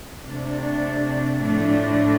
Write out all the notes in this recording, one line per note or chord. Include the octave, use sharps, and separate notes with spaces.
C3 A3 D4
A2 F3 A3 D4